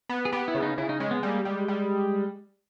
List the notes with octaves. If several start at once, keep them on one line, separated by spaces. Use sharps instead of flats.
B3
G#4
B3 G4
E4
C#3
D#4
C#3 E4
D#4
G#3 C#4
B3
G3 A#3
G3 G#3
G3